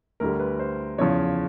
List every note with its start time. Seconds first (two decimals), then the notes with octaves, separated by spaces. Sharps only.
0.20 D2 D3 G3 A#4
0.40 B4
0.60 C5
0.98 E2 C#3 F3 C#5